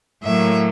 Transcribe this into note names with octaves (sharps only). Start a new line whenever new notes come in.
A2 F#3 A#3 E5